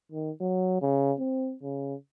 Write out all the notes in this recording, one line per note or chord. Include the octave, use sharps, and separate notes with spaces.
D#3
F#3
C#3
C4
C#3